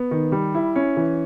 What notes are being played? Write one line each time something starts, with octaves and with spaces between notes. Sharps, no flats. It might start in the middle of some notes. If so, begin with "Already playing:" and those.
Already playing: B3
D#3
G3
E4
C#4
E3